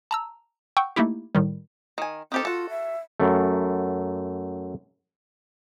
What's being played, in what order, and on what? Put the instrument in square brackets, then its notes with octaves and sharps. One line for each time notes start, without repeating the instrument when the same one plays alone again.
[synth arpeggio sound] A5 A#5 E6
F#5 G5 C#6 E6 G6
A3 A#3 D#4 E4 G4
A2 D#3 G3
[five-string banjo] D#3 G#5
[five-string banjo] D#3 G4 A4 [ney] C4
[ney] F4 [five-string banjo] F#4 A4
[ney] E5
[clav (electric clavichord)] F#2 A3